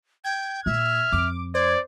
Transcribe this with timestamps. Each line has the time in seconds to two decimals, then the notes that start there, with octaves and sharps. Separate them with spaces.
0.24 G5 G#6
0.66 A#2 E5 F6
1.12 F2 D6
1.55 C5 D5 G#6